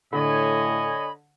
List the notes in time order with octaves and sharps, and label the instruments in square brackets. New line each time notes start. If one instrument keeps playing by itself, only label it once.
[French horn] A2 [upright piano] D3 [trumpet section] C#5 D#5 G#5 [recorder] B5